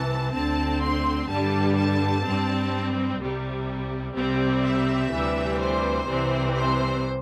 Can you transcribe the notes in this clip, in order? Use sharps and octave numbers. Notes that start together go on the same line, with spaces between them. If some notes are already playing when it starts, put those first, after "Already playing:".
Already playing: C2 C3 E3 A5
D2 D3 C4 A5
C6
G2 D3 G3 A5
A5
G2 G3 C4
C2 C3 G3
C2 C3 G3 C4
E5
D2 C3 E3 G3
C5
C2 C3 E3 G3 C4
C5